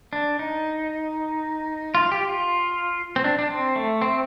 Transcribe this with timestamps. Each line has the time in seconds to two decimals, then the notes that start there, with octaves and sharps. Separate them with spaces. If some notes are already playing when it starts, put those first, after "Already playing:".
0.13 D4
0.39 D#4
1.95 F4
2.12 G4
2.29 F4
3.16 C4
3.24 D4
3.39 D4
3.50 C4
3.76 A3
4.02 C4